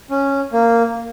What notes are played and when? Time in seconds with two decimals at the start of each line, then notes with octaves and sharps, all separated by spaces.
0.10 C#4
0.52 A#3